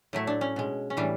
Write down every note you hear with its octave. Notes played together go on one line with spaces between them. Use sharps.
A2 F#3 A3 E4
D4
C#4
B2 G#3
C#4
A2 E3 G3 D4